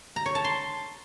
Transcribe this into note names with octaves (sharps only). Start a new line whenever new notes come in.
A#5
C#5
A5
C6